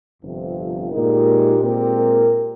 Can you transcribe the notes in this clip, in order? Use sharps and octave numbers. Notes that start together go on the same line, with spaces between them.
G1 F2 C3 F3
A#2 G#3 D#4 G4 A#4
A#2 G#3 C4 G4 A#4